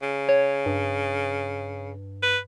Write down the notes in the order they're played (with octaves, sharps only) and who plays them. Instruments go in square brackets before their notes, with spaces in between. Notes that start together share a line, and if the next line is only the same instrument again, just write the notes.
[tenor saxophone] C#3
[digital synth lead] C#5
G2
[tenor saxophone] B4